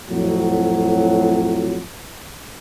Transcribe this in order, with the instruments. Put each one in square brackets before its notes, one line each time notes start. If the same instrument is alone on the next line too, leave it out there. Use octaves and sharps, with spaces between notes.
[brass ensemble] F2 A2 F#3